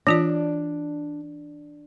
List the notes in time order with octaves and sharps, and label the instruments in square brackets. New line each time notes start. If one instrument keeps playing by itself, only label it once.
[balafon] E3 F4 D5 [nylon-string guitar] D4